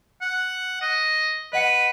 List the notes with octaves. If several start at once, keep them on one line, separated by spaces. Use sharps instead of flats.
F#5
D#5
B4 D#5 F#5 C#7